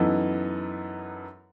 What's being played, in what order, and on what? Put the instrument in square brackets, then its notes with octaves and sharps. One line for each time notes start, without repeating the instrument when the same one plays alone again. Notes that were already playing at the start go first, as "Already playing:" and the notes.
Already playing: [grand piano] F#2 E3 B3 D#4 A4